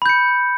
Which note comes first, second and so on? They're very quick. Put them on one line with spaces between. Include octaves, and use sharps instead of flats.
B5 G6 C#7